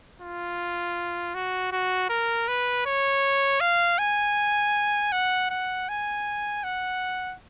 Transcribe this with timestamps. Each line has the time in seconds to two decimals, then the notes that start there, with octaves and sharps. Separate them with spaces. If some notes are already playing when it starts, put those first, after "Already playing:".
0.21 F4
1.35 F#4
1.72 F#4
2.10 A#4
2.48 B4
2.86 C#5
3.61 F5
3.98 G#5
5.12 F#5
5.50 F#5
5.89 G#5
6.64 F#5